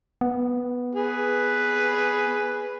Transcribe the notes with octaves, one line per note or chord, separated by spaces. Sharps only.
B3
G#4 B4